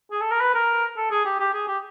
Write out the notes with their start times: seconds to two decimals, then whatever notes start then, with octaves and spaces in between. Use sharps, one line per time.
0.11 G#4
0.21 A4
0.31 A#4
0.40 B4
0.55 A#4
0.97 A4
1.11 G#4
1.25 G4
1.40 G4
1.54 G#4
1.68 G4